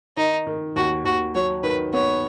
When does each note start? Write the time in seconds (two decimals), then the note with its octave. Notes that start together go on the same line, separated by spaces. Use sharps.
0.17 D#3 D#4
0.47 D#3
0.76 D#2 F#4
1.05 D#2 F#4
1.35 F#3 C#5
1.63 D#3 B4
1.93 B3 C#5